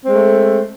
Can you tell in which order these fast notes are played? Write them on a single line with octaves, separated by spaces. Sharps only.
C4 G#3 A3